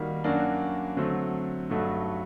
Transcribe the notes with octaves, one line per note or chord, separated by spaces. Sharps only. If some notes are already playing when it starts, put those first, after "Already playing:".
Already playing: D#3 G3 A#3 F#4
F#2 F#3 A#3 D4 F#4
D3 F#3 A3 C4
G2 F#3 A3 D#4 F#4